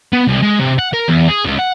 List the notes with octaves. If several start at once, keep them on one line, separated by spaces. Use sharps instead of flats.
B3
C2
G#3
C3
F#5
A#4
E2
G#4
C#2
F#5